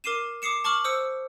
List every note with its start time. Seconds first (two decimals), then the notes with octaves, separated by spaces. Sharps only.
0.04 A#4 D6 C7 D#7 E7
0.42 D6 D#6 C7 C#7 E7
0.64 A5 C#6 D6 F6 F#7
0.84 C5 D#6 E6 C#7